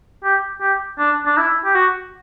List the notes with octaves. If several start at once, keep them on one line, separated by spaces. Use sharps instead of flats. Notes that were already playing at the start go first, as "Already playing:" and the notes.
G4
G4
D4
D4
E4
G4
F#4